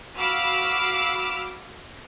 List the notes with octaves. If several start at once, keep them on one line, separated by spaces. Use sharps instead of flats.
F#4 F5 B5 D6 E6 F6